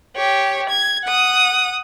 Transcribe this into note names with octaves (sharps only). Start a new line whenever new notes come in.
G4 C#5
G#6
F#5 D#6